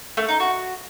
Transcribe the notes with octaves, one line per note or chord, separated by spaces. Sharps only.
A3
D#4
F#4